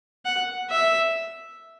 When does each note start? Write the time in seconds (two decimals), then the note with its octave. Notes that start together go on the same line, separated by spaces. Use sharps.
0.25 F#5
0.70 E5